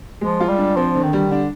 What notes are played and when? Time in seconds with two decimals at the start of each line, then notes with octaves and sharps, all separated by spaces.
0.21 F3 G#3
0.40 F4
0.48 G3
0.58 D4
0.76 F3 C4
0.95 D3
1.03 D#3
1.13 G3
1.31 D3 D4